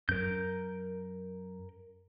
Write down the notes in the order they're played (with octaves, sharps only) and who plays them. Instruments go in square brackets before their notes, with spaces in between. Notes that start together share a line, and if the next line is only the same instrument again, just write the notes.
[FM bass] F#2 [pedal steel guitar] A#4 G6